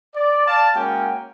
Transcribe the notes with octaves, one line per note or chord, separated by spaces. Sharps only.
D5
D5 F5 A5
G#3 A#3 C#4 F#4 G5